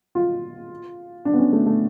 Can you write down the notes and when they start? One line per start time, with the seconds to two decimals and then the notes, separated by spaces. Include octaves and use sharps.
0.15 F4
1.25 D4
1.33 B3
1.39 C#4
1.53 A3
1.66 A3